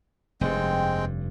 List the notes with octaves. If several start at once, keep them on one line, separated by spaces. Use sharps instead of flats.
F1 G2 G#3 C4 G5